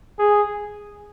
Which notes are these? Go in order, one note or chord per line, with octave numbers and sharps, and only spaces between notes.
G#4